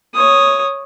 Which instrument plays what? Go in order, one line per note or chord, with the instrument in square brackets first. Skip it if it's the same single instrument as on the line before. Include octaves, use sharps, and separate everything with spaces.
[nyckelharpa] C#5 D#6